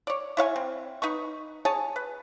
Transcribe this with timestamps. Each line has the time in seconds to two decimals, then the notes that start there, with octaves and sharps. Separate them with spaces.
0.07 C#5 D5
0.37 E4 C#5 F5 G#5
0.56 C4
1.02 D#4 B4 C#6
1.65 G#4 C#5 G#5 A5
1.96 B4